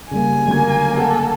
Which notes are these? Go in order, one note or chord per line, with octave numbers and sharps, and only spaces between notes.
C#3 G3 A#3 G#5
D3 F#3 A3 A#3 G#6
A4 A#4 F#5 G#5